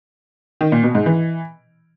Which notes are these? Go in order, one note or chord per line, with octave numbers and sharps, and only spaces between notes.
D#3
A#2
B2
G#2
E3